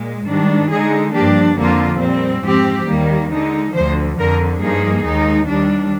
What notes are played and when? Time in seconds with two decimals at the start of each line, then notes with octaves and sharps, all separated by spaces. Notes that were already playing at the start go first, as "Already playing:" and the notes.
Already playing: A#2 G#3
0.27 G#2 D#3 G3 D4
0.71 D3 G#3 D#4 G#4
1.14 G2 F3 A#3 D4 G4
1.57 F2 D3 F3 A#3 F4
2.01 A#2 G3 C4
2.44 G#2 F3 C4 G4
2.88 D#2 D#3 G3 A#3
3.31 D3 G#3 D#4
3.74 D2 D3 F3 C5
4.18 F2 D3 F3 A#4
4.61 G2 F3 A#3 D#4 G#4
5.04 D#2 D#3 G#3 D#4
5.48 D#2 D#3 G3 D4